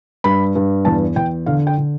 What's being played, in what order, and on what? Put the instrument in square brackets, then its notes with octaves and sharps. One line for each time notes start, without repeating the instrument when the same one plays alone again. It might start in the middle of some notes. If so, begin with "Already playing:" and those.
[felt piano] G2 B5
G2
E2 A5
E2 G5
D3 F5
G5
D3